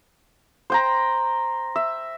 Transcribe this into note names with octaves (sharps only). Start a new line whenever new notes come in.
C5 G5 A#5
E5